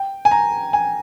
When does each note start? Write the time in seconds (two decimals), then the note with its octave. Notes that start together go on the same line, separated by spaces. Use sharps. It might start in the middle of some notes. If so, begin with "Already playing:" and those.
Already playing: G5
0.25 G#5
0.31 A#5
0.73 G#5